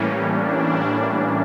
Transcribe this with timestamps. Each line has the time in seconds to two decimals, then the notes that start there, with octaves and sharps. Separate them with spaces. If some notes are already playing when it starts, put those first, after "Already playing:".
Already playing: A2 E3 G3 A#3 C#4
0.24 D4